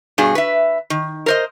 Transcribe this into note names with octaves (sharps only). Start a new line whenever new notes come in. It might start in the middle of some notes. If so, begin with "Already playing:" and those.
G2 B2 G#4
B4 E5
D#3
A#4 C5 D#5